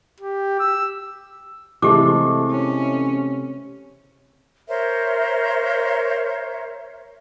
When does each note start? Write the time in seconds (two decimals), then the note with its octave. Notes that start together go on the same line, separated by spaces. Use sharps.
0.20 G4
0.59 E6
1.82 C3 E3 G#3 A3 G4 A4 D6
2.50 C#4
4.68 A#4 C5 C#5 E5